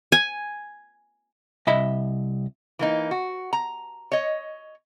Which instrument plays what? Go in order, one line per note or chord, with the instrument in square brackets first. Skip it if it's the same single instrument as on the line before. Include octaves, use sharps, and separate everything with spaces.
[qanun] G#5
[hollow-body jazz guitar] C2 D#5 E5 B5
[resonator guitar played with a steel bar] E3 A#3 D#4
F#4
A#5
C#5 D#5